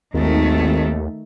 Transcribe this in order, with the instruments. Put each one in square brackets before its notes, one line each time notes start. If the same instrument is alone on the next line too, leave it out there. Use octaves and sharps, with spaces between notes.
[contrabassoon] G#1 [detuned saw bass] D#2 [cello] D#3 A3